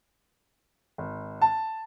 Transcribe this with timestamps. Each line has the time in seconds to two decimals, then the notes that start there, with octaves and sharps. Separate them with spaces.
0.98 G#1
1.42 A5